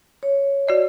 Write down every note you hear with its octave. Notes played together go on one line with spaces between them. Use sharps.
C#5
F#4 D5 D#5